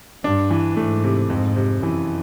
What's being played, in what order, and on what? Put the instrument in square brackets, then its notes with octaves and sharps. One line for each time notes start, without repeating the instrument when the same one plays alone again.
[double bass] G2 [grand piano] D4
[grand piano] E3
[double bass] G#2 [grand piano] A3
[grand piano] C3
[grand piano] F2 [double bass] G#2
[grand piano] C3
[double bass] F#2 [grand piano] E3